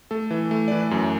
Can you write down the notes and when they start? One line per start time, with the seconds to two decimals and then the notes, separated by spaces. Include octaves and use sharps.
0.11 A3 A4
0.31 E3
0.51 A3
0.68 D5
0.72 E3 B4
0.91 F#2